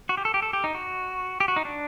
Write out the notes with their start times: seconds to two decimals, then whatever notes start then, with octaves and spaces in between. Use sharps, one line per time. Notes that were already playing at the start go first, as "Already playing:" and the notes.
0.09 F#4
0.17 G4
0.25 A4
0.34 G4
0.42 A4
0.53 G4
0.64 D#4
0.74 F#4
1.40 G4
1.48 F#4
1.56 D#4
1.65 D4